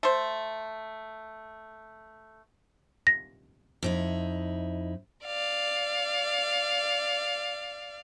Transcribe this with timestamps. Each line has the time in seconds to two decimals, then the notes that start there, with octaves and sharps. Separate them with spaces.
0.03 A3 C5
3.07 A#6
3.83 F2 D#4 E4
5.25 D5 F5